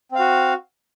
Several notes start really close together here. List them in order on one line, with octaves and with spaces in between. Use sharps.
C4 F5 F#4